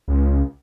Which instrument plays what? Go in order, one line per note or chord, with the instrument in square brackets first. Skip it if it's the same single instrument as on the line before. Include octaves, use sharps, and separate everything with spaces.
[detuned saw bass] C#2